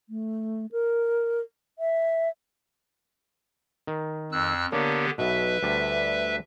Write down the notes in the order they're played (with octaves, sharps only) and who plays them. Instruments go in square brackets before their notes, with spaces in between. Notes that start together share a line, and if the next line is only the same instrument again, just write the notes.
[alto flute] A3
A#4
E5
[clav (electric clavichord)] D#3
[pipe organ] F2 E6 F#6
[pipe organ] D3 B3 G4 [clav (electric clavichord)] A#3 D4 C#5
[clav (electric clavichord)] B1 B2 [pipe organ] B4 E5
[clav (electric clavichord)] D2 G3 D4